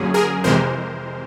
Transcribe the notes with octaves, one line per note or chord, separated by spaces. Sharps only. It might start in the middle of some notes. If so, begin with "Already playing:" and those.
Already playing: F#2 D3 F#3 A#3 C#4 G#4
G#4 A#4
F2 C3 E3 G#3 A#4 C5